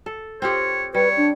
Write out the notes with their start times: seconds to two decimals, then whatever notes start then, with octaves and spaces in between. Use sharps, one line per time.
0.06 A4
0.42 C4 F4 G4 C#5
0.94 G3 B4 C#5
1.17 D4